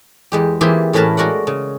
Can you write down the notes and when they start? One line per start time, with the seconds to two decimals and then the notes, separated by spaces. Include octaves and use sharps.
0.32 E2 G#3 G4
0.61 E3 A#3 C4 F4 G4 G#4
0.93 A2 E3 C#4 A#4 B4 A5
1.17 G#3 F#4 A#4 D5 F#5
1.47 C#3